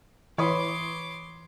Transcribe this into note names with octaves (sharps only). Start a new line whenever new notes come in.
E3 C#5 B5 C6 D6 D#6